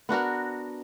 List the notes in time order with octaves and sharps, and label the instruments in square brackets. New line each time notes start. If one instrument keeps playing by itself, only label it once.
[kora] B3 D4 F#4 A#4